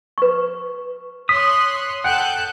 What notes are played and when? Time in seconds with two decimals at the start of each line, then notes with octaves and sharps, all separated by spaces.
0.18 B4 C#6
1.29 C#5 C6 D#6 F#6 B6
2.04 A4 F#5 G5 F#6 G6